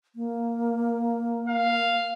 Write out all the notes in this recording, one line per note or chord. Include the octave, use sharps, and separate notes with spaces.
A#3
F5